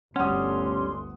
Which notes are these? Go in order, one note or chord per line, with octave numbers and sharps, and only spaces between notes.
G1 D2 G3 C#4 F#5 C6 D#6